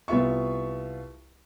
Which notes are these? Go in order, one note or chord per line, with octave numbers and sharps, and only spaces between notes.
C2 B3 F4 E5 C#6